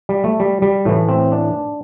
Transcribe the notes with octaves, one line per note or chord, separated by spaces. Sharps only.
G3
A3
G3
G3
A2 E3 A3
C4
D4